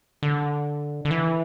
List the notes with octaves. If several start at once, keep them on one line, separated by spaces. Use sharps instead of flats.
D3
D3
E3